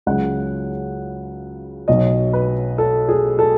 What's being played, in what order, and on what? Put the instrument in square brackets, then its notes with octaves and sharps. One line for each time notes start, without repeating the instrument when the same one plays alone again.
[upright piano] C#2 C#3 F#3 F#5
B1 B2 F#3 D#5
B4
A4
G#4
A4